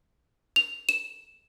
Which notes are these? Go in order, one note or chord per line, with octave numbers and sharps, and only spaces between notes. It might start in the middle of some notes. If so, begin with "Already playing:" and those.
F7
E7